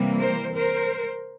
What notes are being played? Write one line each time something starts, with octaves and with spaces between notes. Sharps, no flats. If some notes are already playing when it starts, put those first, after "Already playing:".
Already playing: C3 E3 G3 A#3
A#4 C5
A#4 C5